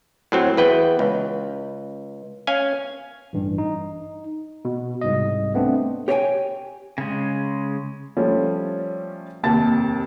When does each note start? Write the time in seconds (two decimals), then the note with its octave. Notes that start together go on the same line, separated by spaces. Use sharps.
0.32 A2 F#3 C4
0.57 E2 B4 G5
0.99 C#2
2.47 C#4 F5 G#5
3.33 A1 G2
3.58 D#4
4.65 B2
5.01 C2 G#2 D#5
5.54 A3 B3 C4 D4
6.08 G4 C#5 D#5 E5 G5 G#5
6.98 C#3 G#3
8.17 F3 G3 A3 C#4
9.43 F1 D#2 A5 A6